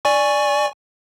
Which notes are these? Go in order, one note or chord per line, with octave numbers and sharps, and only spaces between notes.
D5 G#5 C#6